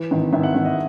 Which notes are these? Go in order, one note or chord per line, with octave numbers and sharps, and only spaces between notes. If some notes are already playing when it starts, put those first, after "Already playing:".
Already playing: E3
G#1
G#1 E5
F#5
G#1 E5
D#5